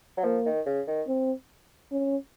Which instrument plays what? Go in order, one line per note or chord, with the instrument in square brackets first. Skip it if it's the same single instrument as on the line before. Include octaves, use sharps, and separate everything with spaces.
[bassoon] F#3
[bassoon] F3 [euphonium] A#3
[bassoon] D#3
C#3
D#3
[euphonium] C4
C#4